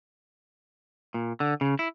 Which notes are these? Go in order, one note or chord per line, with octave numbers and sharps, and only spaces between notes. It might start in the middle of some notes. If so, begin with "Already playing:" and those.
A#2
D3
C#3
E4